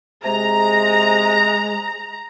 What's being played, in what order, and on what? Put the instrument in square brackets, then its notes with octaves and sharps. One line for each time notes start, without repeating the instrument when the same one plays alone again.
[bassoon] C3 [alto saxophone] G#3 [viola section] A#5